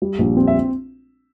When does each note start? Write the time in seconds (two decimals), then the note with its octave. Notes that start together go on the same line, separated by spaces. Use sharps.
0.02 G3
0.19 A#1
0.37 C4
0.47 E5